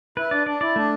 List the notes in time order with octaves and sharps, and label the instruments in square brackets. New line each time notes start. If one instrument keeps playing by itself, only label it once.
[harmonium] E4 [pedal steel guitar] B4
[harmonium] D4 [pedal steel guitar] D5
[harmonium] D4 [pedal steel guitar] D5
[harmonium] E4 [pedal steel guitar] D5
[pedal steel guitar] A3 [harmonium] D4